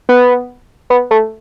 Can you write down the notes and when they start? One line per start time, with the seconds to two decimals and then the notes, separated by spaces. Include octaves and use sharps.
0.09 B3
0.90 B3
1.11 A3